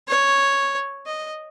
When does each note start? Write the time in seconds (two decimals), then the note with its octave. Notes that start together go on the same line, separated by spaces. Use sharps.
0.08 C#5
1.06 D#5